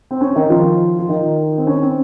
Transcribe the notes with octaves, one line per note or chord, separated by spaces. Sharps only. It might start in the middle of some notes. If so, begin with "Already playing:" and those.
C4
C#4
D#3 D#4
F3 F4
F4
D#3 D#4
C4
C#4
C4